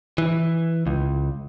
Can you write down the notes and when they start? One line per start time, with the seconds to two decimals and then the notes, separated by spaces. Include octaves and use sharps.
0.18 E3
0.87 C#2